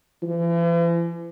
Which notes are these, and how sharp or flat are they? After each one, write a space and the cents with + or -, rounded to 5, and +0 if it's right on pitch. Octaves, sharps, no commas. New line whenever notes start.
E3 +45